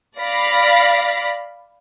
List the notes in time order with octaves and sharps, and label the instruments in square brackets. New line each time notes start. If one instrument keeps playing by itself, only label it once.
[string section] D5 F5 B5 A#6 B6